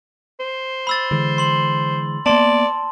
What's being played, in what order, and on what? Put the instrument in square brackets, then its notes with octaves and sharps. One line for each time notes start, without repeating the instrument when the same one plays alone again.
[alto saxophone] C5
[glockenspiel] B5 E6 A6
[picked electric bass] D3 E3 G#3
[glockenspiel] C6 F#7
[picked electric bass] A#3 B3 [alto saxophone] D5 [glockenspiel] A5 C6